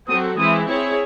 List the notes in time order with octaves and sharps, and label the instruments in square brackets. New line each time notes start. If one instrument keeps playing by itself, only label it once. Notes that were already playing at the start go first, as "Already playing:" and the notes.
[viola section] F#3 C4 F#4 A4 [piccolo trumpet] D#6
[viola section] E3 G#3 C4 E4 [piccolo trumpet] D#6
[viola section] C4 E4 G#4 C#5